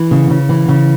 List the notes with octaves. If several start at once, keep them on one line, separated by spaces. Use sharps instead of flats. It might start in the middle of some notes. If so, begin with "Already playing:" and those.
Already playing: E3
C#3
C#3
E3
C#3